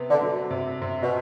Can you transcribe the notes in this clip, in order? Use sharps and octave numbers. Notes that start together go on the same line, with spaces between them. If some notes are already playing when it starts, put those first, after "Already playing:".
Already playing: C3 B3
D3
F#3
C3
C3
B2